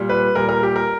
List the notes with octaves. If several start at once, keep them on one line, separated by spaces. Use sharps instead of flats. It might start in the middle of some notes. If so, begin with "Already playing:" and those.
Already playing: A#2 G3
B4
A#2 G3 A#4
A#4
G4
A#4